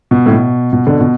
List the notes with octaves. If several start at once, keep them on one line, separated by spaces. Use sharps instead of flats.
B2
A2
B2
B2
B2 D3
B2